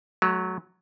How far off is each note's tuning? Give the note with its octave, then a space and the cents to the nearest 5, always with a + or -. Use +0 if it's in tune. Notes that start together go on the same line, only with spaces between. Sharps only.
F#3 +0 A3 -35